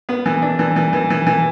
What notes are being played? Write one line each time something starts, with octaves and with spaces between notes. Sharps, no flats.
B3
E3
D4
E3
E3
E3
E3
E3